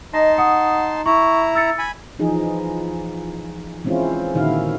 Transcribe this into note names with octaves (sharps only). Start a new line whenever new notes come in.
D#4 D#5 A5 C6 A#6
F#5 D#6 C#7
E4 A#5 C#6
E6 A6 C#7
G#5 B5
E3 F3 D#4 G#4
E3 G#3 C4 C#4 E4 F4
A#2 D3 D#3 E4 F#4 F5